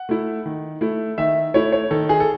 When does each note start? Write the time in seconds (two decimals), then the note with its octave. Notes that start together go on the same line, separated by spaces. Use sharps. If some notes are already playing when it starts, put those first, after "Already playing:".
Already playing: F#5
0.09 A3 E4
0.46 D#3
0.81 A3 E4
1.18 D#3 E5
1.54 A3 E4 C#5
1.72 C#5
1.91 D#3 A4
2.09 G#4
2.20 A4